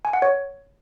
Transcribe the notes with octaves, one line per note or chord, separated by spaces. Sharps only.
G#5
F#5
C#5